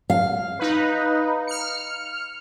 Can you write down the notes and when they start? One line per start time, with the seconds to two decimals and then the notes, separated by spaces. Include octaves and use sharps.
0.10 F5
0.59 D#4 B4
1.47 F6 C#7